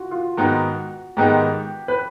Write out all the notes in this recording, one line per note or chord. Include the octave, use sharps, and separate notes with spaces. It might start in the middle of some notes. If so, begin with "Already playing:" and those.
Already playing: F4 F#4
F4
G#2 D#3 G#3 B3 D#4 F#4
G#2 D#3 G#3 B3 D#4 G4
B4